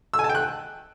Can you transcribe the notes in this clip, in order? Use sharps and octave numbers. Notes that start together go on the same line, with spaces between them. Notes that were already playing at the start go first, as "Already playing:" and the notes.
E6
G#5
A5
G5
F#6